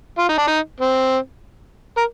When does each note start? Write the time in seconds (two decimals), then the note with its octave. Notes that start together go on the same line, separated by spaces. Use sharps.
0.18 F4
0.29 D#4
0.38 D4
0.47 D#4
0.80 C4
1.97 A#4